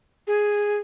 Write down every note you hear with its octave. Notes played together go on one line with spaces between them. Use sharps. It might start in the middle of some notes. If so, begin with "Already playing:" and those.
G#4